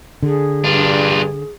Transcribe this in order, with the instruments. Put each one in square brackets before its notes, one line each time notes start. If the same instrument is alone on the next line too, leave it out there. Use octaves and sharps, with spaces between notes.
[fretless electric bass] D3 [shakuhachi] G#4
[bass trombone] G2 [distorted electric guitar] D4 F4